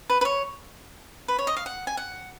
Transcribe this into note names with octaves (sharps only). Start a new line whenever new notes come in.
B4
B4
C#5
B4
C#5
D#5
F5
F#5
G#5
F#5